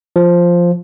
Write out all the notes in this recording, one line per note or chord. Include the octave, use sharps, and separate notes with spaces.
F3